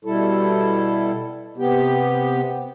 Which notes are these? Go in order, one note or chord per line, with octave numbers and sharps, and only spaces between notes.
B2 G3 E4 A4
C3 B3 G4